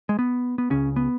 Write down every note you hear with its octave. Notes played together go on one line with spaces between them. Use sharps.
G#3
B3
B3
C#2 C#3 C#4
B3